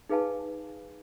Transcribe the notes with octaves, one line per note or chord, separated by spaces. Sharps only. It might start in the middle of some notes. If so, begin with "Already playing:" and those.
D#4 G#4 B4 F5 G#5 A5